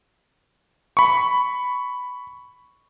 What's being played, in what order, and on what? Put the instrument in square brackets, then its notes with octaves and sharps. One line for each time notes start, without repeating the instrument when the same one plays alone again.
[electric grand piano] B5 C#6